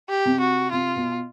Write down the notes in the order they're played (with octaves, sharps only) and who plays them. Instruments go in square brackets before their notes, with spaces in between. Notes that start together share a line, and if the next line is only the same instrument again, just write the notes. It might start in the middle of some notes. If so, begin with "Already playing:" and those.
[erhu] G4
[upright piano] C3
[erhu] F#4
[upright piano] C3 [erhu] F4
[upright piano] B2